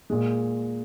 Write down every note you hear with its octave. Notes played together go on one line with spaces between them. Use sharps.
A#2 G#3